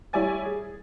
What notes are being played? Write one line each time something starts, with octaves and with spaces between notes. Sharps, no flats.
G3 E4 C#5 D5 G#5 A6
G#4